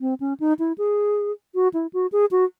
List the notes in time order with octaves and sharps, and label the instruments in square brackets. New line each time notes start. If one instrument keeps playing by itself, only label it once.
[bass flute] C4
C#4
D#4
E4
G#4
F#4
E4
F#4
G#4
F#4